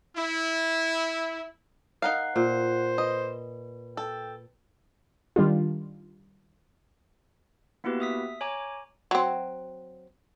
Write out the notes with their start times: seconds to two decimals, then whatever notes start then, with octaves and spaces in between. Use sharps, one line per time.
0.17 E4
2.02 D#4 A#4 F5 F#5 F#6 C7
2.36 A#2 C5
2.98 B4 D#5
3.97 A4 G5
5.36 D#3 G3 D4 F4
7.84 A#3 B3 E4 F#4 G4 B4
8.00 E5 D#6 B6
8.41 C#5 G#5 A#5 D6
9.11 F#3 C4